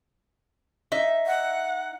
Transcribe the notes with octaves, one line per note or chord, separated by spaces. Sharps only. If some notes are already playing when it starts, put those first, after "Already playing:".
D#4 E5
F#5